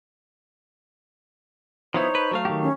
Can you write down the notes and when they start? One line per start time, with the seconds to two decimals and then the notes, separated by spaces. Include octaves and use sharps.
1.94 F3 B3 D#4 E4 C5 C#5
2.15 B4
2.31 F#3 A3 F5
2.45 D#3 G4
2.62 C#4